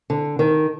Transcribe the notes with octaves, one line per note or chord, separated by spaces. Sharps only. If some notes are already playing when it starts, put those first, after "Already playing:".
D3
D#3